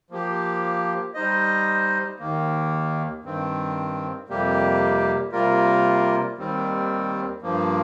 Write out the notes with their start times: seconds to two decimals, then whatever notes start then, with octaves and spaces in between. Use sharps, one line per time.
0.10 F3 A#3 G4
1.14 G3 D#4 C5 D#5
2.19 D#2 D#3 A#3
3.23 G2 D#3 C4
4.28 F2 C3 G3 A#3 G4
5.32 C3 G3 A#3 F4 A#4
6.37 D#2 D#3 G3 C4
7.42 G2 F3 A#3